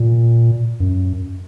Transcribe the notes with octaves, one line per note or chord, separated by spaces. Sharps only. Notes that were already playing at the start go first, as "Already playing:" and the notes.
Already playing: A#2
F#2